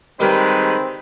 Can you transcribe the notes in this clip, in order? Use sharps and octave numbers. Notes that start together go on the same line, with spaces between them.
D#3 G3 G#3 C4 A#4 B4